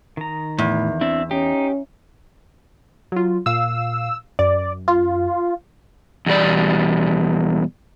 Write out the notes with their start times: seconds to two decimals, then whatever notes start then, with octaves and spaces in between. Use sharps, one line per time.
0.17 D#3 A#5
0.58 E2 A2
1.01 C4 D4 E4 E5
1.31 C#4 D#4 G4
3.12 F#3 F4
3.46 A#2 F5 E6
4.39 F#2 D5
4.88 F4
6.26 E2 B2 G3 D5